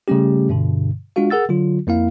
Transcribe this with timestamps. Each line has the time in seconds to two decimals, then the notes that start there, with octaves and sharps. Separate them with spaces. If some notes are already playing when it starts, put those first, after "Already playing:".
0.08 C#3 G3 A3 C#4 G4
0.50 G2 B2 D3
1.16 G#3 D4 F4 F#4 F5
1.30 G#4 A#4 F#5 E6 A6
1.49 D3 F#3 F4
1.87 F2 A#3 E4 F5